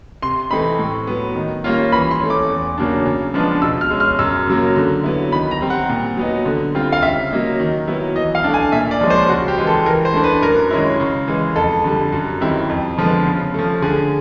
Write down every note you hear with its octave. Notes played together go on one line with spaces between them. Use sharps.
C3 C6
E3 A3 C4 D#4 B5
A2
F#3 B3
D#3
G3 A#3 C#4 F4
E3 B5
C6
A3 C#4
D6
E2
C#3 F#3 A#3 D4
C#3
F3 G#3 B3 D4
B2 E6
F6
G#3 C#4
F6
F#2 E6
C#3 F#3 A#3
D3
F#3 B3 E4
D#3 B5
A#5
G3 C4
F#5
A#2
F#3 B3 D#4
D3
G3 C4 F4
F5
C#3 E5
F#3 A#3 D#4
D#3
F#3 B3 E4
E3 D#5
F5
A3 D4
G#5
A#2 E5
D5
F3 G#3 C#4
C5
C#3 F#4
G4
E3 G#3
A4
E3 A#4
C5
A3 D4
B4
F#2 A#4
D#3 G#3 C#4 E4
C#3
E3 G#3
F2 A4
D3 G3
F#2
D#3 G3 C4 E4
F2
D3 F3 G#3 B3
C#3
F3 A3
D3 G#4